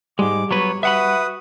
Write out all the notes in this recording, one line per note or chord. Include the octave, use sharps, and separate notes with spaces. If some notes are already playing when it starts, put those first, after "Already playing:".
G#2 G3 G#3 D6
F#3 B3 B4 C#5
F#4 B4 E5 F#5 B5 D#6